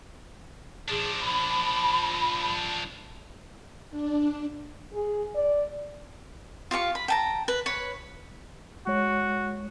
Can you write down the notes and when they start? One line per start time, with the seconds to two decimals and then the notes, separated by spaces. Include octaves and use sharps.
0.89 F3 D4 G#4
1.21 B5
3.90 D4
4.93 G#4
5.35 D5
6.71 F4 G4 F5 C#6
6.95 B5
7.08 G5 A5 A#5
7.48 B4
7.66 B4 C#5
8.87 G#3 F#4 C#5